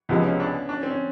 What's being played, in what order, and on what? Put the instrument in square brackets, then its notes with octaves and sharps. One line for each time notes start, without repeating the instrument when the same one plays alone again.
[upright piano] C#2 C3 F3 G#3 [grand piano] B3
[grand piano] C#4
D4
D4
C#4
C4
C#4